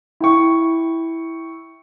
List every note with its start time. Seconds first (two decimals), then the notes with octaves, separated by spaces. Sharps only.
0.20 E4 G5 C#6